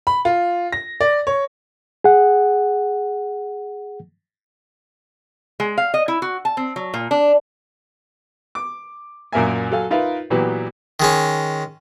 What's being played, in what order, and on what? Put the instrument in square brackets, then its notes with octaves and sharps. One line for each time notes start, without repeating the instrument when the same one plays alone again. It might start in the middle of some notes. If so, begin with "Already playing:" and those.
[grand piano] B5
F4
A#6
D5
C#5
[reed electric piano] G#4 F#5
[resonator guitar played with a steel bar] G#3
F5
D#5
E4
F#4
A5
C4
F#3
A#2
D4
[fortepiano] D6
F#2 A#2 A#3 A#4 E5 G#5
F#3 A4 F5 G#5
D#4 F4 A#4 B4 E5 F5
A#2 E3 F#3 B3 G4
[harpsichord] D#3 G#3 C#4